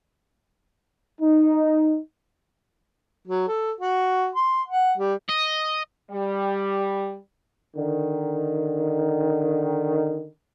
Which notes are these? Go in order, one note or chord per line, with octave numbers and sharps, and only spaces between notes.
D#4
F#3
A4
F#4
C6
F#5
G3
D#5
G3
D3 D#3